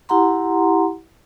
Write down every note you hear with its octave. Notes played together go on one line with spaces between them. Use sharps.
E4 G4 F#5 A#5 C6